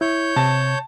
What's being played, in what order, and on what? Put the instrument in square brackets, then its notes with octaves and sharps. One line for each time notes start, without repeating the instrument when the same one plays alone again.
[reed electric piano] E4 [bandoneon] C#5 G6
[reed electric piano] C3 [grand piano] A5